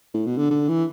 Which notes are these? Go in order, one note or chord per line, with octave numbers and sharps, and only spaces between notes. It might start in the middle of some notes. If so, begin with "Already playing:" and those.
A2
B2
D3
D3
E3